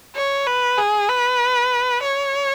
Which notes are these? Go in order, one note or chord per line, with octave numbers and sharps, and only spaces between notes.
C#5
B4
G#4
B4
C#5